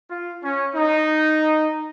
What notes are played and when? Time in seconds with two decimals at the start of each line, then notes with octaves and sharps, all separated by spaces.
0.10 F4
0.43 C#4
0.75 D#4